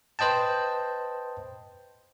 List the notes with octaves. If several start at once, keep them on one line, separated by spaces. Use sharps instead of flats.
B4 C5 D#5 G5 A5